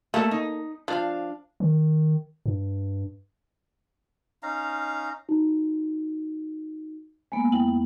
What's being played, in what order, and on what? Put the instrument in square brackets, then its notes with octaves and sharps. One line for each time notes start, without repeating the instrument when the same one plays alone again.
[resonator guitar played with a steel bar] A3 E5 [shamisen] A#3 A4
[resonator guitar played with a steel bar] D#4
[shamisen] F3 [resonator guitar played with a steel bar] D4 F5
[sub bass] D#3
G2
[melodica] C#4 D#4 F5 A#5
[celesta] D#4 F#4
[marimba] G#3 A#3 B3 [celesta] G#5
[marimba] F2 [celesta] E4 G5 F#7